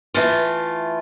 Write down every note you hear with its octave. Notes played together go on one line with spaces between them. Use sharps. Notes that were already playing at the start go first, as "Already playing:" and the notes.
E3 A3 F4